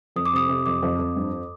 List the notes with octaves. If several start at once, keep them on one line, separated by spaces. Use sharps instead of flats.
F2 D#6
D6
C3 D#6
C3
F2 D6
F2
F2
G2